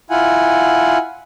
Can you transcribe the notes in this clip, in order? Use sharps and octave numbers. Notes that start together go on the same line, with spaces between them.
E4 F4 F#5 G#5